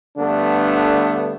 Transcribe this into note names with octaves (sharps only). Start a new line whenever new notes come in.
G2 D3 A3 B3 D4